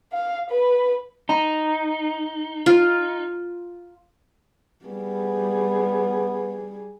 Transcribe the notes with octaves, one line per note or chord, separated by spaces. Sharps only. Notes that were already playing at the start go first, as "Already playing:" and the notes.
F5
B4
D#4 A#5
F4
G3 B3 G#4